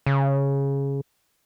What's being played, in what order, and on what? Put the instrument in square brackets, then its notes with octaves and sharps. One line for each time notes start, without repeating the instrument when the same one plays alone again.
[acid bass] C#3